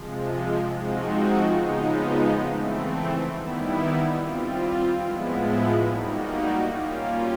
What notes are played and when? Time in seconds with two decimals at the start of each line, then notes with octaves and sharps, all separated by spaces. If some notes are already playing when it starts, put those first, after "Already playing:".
Already playing: C3 F3 G#3
0.73 F3 G#3 C4 D#4 F#4
1.59 C#3 F3 G#3 B3 D#4
2.45 E3 A3 C4
3.30 D#3 G3 B3 E4
4.16 G3 C4 F4
5.01 A2 F3 G#3 B3 E4
5.87 G3 A#3 D#4 F#4
6.72 G3 A#3 C#4 F4